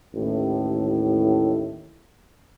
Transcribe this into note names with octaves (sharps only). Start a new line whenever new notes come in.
A1 D#2 A2